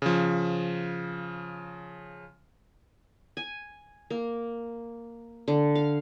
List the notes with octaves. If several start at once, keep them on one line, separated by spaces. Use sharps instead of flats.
C#3 F3
G#5
A#3
D3
F5